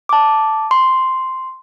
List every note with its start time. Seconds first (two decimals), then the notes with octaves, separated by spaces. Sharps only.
0.09 A5 D6
0.71 C6